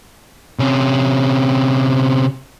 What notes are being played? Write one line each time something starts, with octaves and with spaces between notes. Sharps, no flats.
C3 C#4